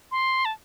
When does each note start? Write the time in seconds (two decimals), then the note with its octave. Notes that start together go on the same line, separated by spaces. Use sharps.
0.11 C6
0.45 A5